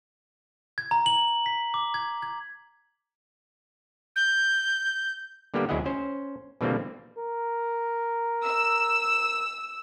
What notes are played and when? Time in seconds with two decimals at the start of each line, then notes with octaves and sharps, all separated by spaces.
0.78 G#6
0.91 A#5
1.06 F#7
1.46 B6
1.74 D6
1.94 G#6
2.22 G#6
4.16 G6
5.54 D3 G3 A#3 B3 G4
5.69 D2 F#3 E4 G#4 D#5 F#5
5.86 C#4 C5
6.61 B2 D3 E3 G3 A#3 C4
7.18 A#4
8.46 E6